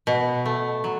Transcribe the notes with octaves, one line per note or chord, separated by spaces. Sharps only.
B2
A3
F#3